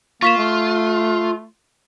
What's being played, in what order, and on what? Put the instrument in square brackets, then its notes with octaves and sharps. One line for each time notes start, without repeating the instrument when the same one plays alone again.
[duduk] A#3 [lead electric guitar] F4 [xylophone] C#6 B6 E7
[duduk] A3